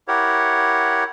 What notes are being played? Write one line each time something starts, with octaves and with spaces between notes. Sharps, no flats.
E4 G4 A#4 C#5 F#5